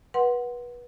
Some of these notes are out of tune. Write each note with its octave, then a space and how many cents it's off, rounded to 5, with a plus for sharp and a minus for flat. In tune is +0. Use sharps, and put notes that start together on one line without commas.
B4 -25 F#5 +0 C6 +0